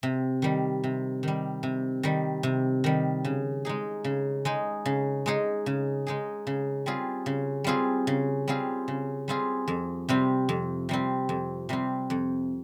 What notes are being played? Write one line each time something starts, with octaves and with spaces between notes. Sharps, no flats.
C3
D#3 G3
C3
D#3 G3
C3
D#3 G3
C3
D#3 G3
C#3
G#3 D#4 G#4
C#3
G#3 D#4 G#4
C#3
G#3 D#4 G#4
C#3
G#3 D#4 G#4
C#3
G3 C4 F4 G#4
C#3
G3 C4 F4 G#4
C#3
G3 C4 F4 G#4
C#3
G3 C4 F4 G#4
F2
C3 G3 C4
F2
C3 G3 C4
F2
C3 G3 C4
F2